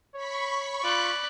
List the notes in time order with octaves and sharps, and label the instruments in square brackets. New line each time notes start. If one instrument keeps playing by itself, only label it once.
[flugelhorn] C#5 [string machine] B5 C#6 B6
[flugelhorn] F4 [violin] D5 F#6